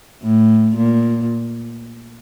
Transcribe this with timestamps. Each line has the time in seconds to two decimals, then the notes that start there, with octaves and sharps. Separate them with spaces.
0.22 A2
0.76 A#2